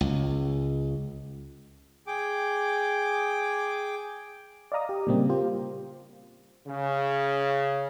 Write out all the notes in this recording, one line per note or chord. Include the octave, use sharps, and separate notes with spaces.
C#2
G#4 G5 D6
D5 D#5 F5 A#5 D#6
G4
A#2 C#3 G3 A#3 C4
A#3 F4 G4 C5
C#3